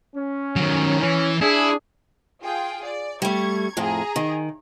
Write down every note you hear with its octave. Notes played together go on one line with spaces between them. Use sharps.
C#4
D#3 F#3
E3 C#4
D4 E4 G#4
F4 G#4 G5
D5
G3 A3 C#6 G#6
F2 A2 G#4 A#5
D#3